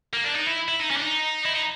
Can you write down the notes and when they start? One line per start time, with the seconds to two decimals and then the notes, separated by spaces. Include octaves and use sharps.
0.14 A#3
0.24 D4
0.35 D#4
0.47 E4
0.68 E4
0.80 D#4
0.91 C#4
0.97 D4
1.02 D#4
1.45 E4
1.53 D#4